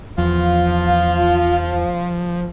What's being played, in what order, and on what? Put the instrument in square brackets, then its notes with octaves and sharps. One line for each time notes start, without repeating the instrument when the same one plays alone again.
[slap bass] E2 [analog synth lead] F3 [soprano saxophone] F4 [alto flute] F5